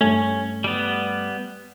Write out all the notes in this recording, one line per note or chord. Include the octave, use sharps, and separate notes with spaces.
G2 A3 C#4
G3 B3